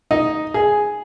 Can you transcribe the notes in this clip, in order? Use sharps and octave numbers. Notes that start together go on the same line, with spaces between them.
D#4
G#4